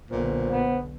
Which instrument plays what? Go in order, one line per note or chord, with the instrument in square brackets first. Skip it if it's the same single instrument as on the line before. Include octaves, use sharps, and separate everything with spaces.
[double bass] B1 D3 [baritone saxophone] A#2 [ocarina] C5
[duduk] B3